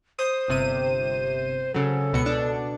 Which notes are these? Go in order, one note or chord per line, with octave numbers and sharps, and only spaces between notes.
C5 D#6
G1 C3 D#7
C#3 F#3 A4
C#2 B2 C#7
B2 D4